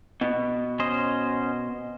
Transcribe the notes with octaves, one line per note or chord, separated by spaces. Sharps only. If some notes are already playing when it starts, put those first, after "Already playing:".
B2
C#4 C5 D#5